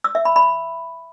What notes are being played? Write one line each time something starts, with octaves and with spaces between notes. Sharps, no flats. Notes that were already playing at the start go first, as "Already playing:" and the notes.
E6
E5
B5
B5